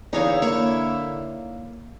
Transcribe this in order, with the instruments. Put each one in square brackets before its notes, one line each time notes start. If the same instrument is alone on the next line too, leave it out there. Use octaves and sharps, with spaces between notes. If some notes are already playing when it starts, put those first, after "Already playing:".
[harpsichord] E2 [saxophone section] D3 E4 [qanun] D#4 C#5 F5
[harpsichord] A#3 [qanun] C#5